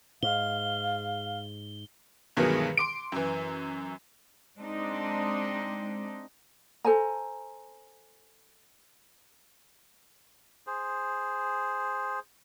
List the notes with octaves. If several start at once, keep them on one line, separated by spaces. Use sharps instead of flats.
G#2 F5 G7
G2 B2 D#3 E3 F#3 G#3
C6 D6 D7
F#2 E3
G#3 C4 D4 D#4
A4 C5 G#5 A#5
G#4 C5